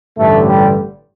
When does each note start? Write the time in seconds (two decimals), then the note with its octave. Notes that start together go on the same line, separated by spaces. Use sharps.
0.17 A1 G2 D3 A3
0.46 G3